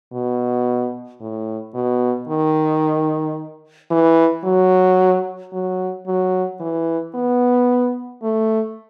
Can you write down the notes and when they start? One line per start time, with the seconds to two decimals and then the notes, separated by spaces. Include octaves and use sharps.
0.13 B2
1.21 A2
1.74 B2
2.29 D#3
3.91 E3
4.45 F#3
5.53 F#3
6.07 F#3
6.60 E3
7.15 B3
8.23 A3